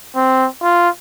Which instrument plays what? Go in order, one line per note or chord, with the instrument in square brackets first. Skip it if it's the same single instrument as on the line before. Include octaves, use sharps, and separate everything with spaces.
[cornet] C4
F4